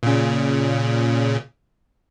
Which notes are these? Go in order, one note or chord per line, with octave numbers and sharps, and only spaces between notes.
A#2 C#3